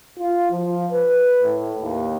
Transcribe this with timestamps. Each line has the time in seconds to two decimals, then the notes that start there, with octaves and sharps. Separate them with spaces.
0.19 F4
0.51 F3
0.91 B4
1.43 A2
1.79 D#2